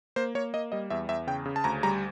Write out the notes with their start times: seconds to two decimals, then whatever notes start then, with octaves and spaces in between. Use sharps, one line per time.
0.16 A#3 C5
0.35 A#3 C#5
0.54 A#3 D#5
0.72 G3 D#5
0.90 E2 E5
1.09 E2 E5
1.27 C#3 G5
1.46 C#3
1.56 A5
1.64 D2 A#5
1.83 G3 A#5